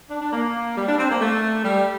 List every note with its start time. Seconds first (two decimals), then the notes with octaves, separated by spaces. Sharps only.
0.10 D4
0.21 D4
0.33 A#3
0.77 G3
0.88 D4
0.98 C4
1.10 A#3
1.20 A3
1.64 G3